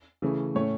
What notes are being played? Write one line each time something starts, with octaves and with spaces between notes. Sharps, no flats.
C#3 E3 A3 C#4
A2 A3 C#4 C#5